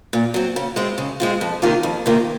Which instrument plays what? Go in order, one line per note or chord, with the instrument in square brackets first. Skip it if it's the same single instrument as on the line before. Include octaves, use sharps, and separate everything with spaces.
[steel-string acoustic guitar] A#2
F#3 C4
C#3
G#3 C4 F4
C#3
G#3 C4 F4
F2
C3 D#3 A#3 F4
F2
C3 D#3 A#3 F4